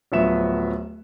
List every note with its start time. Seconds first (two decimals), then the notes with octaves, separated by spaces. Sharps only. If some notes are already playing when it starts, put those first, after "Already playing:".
0.12 D1 F3 F#3 B3 E5 E7